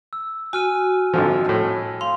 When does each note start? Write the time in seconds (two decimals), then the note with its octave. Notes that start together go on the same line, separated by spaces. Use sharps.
0.13 E6
0.53 F#4 G#5 F6 D#7
1.14 G#1 D3 F3
1.49 A2
2.01 F5 C6